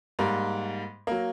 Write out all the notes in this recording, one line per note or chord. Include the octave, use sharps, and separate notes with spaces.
G#2 G3 A#3
F#3 A#3